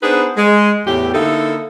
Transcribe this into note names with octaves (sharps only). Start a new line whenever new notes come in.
B3 D4 D#4 G#4 B4 C5
G#3
E2 A2 G4
D3 A#3 D#4 E4 A4